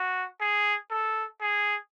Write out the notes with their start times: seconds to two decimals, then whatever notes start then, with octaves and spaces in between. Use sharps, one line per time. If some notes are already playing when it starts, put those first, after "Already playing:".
Already playing: F#4
0.41 G#4
0.91 A4
1.41 G#4